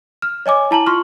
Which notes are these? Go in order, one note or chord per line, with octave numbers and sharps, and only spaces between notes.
F6
C#5 D#5 G#5 D6
E4 A5 A#5 F#7
F4 C6 C#6 F6